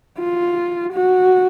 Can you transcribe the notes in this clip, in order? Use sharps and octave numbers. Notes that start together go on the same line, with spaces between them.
F4
F#4